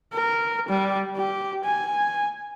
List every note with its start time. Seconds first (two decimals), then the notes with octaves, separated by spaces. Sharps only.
0.13 A#4
0.69 G3
1.16 G4
1.65 G#5